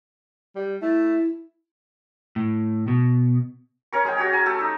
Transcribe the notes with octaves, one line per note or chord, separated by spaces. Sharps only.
G3
A3 E4
A2
B2
C#4 A#4 C#6
G#3 G#4 G5
F#4 G4 C#5
G#5 A#5
A3 G4 A4
D#4 E5